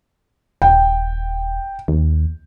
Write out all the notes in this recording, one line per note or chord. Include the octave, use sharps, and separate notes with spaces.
D#1 G5
D#2